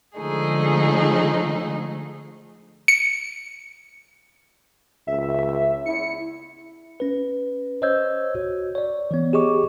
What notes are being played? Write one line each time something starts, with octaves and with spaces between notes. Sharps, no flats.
D3 F3 G#3 A3 D#4 G#4
C#7
C#2 E5
E4 C#7
C#4 B4
C5 C#5 D#5 E6 G6 G#6
F#4
C#5 D5
E3 B3
G4 G#4 D#5 C#6 D6